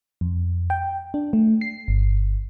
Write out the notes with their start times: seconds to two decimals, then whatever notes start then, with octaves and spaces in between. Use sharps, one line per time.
0.21 F2
0.70 G5
1.14 D4
1.33 A3
1.61 C7
1.88 G1